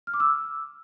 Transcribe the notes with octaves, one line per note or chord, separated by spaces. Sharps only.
F6
D6
E6